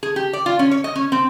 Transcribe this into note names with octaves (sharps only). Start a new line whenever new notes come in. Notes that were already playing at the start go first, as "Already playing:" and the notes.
G#4
G4
D5
F4
C#4
C#5
D#5
C#4
C4